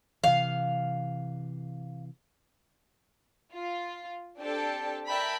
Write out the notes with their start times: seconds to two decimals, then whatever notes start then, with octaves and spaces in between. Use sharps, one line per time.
0.24 C3 E3 F5
3.54 F4
4.39 C4 D4 G4 A4 G5 A5
5.08 A#4 D5 E5 G5 A5 B5